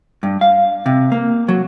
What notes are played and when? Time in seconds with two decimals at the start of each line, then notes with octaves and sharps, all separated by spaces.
0.23 G2
0.41 F5
0.86 C3
1.12 A#3
1.48 F#3